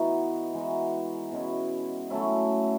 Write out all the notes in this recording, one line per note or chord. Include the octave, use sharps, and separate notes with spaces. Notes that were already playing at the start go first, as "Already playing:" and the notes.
Already playing: E3 B3 D#4 F#4
E3 G#3 D#4 F#4
B2 G#3 C#4 E4
F#3 A3 C#4 E4